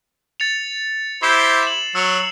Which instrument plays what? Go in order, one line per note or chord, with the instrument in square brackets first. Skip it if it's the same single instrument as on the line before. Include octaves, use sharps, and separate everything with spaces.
[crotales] A6 C#7 F7
[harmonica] E4 G4 C5 [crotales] C7 E7
[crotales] E7 F#7
[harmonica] F#3 [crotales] E6 C#7 F7